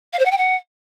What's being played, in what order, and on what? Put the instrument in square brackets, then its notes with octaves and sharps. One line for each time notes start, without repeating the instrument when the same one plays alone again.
[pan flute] F5
C5
F#5
G5
F#5